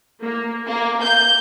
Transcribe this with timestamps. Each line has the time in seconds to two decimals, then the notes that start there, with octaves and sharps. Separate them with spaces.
0.22 A#3
0.67 A#3
1.01 G6